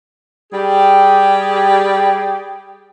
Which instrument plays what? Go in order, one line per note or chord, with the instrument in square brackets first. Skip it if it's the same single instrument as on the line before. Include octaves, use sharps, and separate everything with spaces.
[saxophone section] G3 G4 G#4